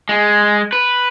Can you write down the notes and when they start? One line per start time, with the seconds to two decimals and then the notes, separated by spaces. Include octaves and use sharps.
0.09 G#3
0.73 B4